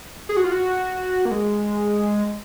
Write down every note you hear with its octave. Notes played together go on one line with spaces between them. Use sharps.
G#4
F#4
F4
F#4
A#3
G#3